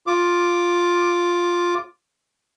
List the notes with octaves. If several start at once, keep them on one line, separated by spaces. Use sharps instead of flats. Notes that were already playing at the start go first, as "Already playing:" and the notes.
F4 D6